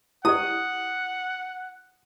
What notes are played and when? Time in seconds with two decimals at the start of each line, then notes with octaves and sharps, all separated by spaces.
0.25 E4 G4 D5 F#5 D#6